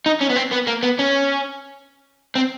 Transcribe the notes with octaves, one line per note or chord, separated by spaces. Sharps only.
D#4
C#4
B3
C4
B3
A#3
B3
C#4
C4